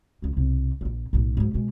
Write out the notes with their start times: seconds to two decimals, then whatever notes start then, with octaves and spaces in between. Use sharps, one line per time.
0.22 C#2 F3
0.37 C2 B2
0.81 D#1 A#1
1.13 B1 A2
1.37 G#2 F#3
1.54 B2 G#3